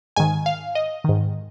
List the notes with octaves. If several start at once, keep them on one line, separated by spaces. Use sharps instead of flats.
G#2 D#3 G#5
F5
D#5
G#2 D#3